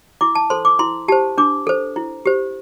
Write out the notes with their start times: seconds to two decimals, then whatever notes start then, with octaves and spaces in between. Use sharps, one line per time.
0.21 E4 D6
0.35 A5
0.50 A4 C5 C6
0.65 D6
0.79 E4 C6
1.08 G4 C5 A5
1.38 D4 D6
1.67 A4 C5
1.96 E4
2.26 G4 C5